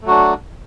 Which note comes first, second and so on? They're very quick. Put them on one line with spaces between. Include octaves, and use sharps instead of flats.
A3 F#3 F#4 D4